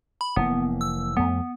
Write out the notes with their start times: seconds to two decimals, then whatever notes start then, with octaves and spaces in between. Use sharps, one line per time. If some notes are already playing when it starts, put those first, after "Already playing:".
0.21 B5
0.36 F1 E3 A#3 B3
0.81 E6
1.17 F2 A3 B3